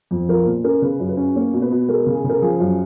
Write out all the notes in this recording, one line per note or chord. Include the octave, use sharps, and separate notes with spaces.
F2
F3 A#4
A#2
C#4 A#4
C#3 B4
F#2
B4
C#4
A#3 C#5
B2
B4
B2
G#3 A#4
C#3
G#4
C#3
A#4
F3 G#4
F#2